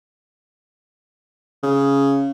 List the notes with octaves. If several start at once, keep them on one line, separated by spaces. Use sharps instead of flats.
C#3